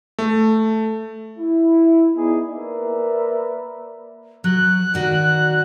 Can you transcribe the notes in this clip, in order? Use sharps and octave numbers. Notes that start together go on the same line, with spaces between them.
A3
E4
B3 D#4 E4 G#4 D5
A#3 A#4 B4 D5 E5
F#3 F#6
D#3 F#4 D5